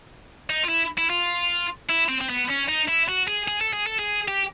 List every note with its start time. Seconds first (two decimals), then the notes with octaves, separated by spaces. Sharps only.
0.50 D#4
0.64 F4
0.69 E4
0.98 E4
1.10 F4
1.89 E4
2.09 C4
2.21 C4
2.29 B3
2.49 C#4
2.68 D#4
2.88 E4
3.08 F#4
3.28 G#4
3.48 G#4
3.61 A4
3.73 G#4
3.86 A4
3.99 G#4
4.28 G4